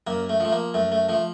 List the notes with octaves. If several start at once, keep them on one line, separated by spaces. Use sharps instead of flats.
F#2 A#3
A3
F3 A3
A#3
F#2 A3
A3
F3 A3